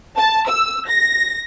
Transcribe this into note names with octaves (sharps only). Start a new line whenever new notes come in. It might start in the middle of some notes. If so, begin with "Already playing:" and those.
A5
E6
A#6